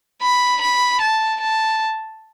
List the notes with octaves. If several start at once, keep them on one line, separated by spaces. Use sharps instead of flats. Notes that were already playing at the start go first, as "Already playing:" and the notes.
B5
B5
A5
A5